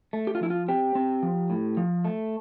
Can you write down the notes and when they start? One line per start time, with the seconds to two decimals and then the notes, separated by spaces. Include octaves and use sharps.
0.13 A3
0.27 G4
0.35 F4
0.41 F3 E4
0.50 F4
0.68 C4 G4
0.95 C4
1.23 F3
1.50 A2
1.77 F3
2.05 A3